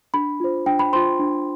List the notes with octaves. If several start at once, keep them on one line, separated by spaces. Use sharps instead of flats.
D4 B5
F4 C5
D4 G5
B5
F4 C5 C6
D4